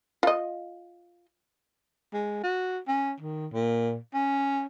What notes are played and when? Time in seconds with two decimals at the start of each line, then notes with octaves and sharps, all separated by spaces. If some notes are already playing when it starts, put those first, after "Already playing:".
0.23 F4 D#5
2.14 G#3
2.43 F#4
2.88 C#4
3.21 D#3
3.53 A#2
4.14 C#4